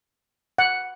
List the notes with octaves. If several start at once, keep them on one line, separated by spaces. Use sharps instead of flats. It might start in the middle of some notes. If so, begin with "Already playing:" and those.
F#5